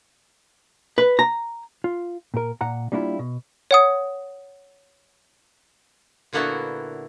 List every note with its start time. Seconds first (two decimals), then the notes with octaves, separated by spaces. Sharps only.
0.98 B4
1.19 A#5
1.84 F4
2.34 A#2 A#4
2.61 A#2 F#5 A#5
2.92 G3 A#3 D4 E4 F4
3.19 B2
3.71 C#5 F#5 D#6
6.33 A#2 D3 A#3 B3 E4 F#4